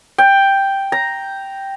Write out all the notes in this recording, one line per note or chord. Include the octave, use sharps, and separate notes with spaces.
G5
A#5